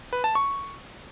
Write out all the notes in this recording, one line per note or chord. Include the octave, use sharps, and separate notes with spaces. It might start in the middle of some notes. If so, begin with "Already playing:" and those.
B4
A5
C#6